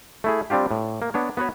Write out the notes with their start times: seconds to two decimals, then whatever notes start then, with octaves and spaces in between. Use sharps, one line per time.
0.24 A3 E4 G#4
0.50 G3 C4 D4 F4 G4
0.71 A2
1.02 A#3
1.14 B3 D4 C#5
1.37 B3 F#4 B4 C#5